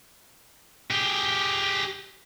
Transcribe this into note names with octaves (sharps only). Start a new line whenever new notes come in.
G4 G#4